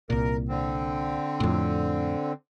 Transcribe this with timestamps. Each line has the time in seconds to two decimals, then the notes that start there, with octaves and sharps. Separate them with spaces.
0.10 C2 A#2 A#4
0.49 D3 C4
1.40 F2 A2